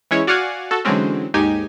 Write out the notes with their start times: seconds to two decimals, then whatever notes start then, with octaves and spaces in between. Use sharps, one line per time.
0.11 E3 G#3 C#4 E4 C#5
0.27 F#4 D5 F5 F#5 G#5
0.71 F#4 A4
0.85 D3 E3 F#3 G#3 C4 C#4
1.34 D#2 G#2 D#4 G4 G#5